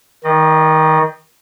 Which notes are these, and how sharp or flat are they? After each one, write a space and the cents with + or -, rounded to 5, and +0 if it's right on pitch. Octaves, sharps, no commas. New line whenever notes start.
D#3 +20 D#5 -40